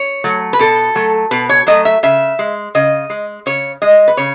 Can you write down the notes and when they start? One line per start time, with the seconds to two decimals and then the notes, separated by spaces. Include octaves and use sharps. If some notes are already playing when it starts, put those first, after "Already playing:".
Already playing: C#5
0.24 F#3 A3
0.53 B4
0.59 B2 A4
0.95 F#3 A3
1.31 B2 B4
1.49 C#5
1.67 F#3 A3 D#5
1.85 E5
2.03 C#3 E5
2.39 G#3
2.75 C#3 D#5
3.10 G#3
3.46 C#3 C#5
3.82 G#3 D#5
4.08 B4
4.17 C#3 C#5